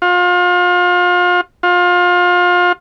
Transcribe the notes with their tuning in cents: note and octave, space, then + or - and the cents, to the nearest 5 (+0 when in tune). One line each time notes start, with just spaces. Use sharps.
F4 +35
F4 +30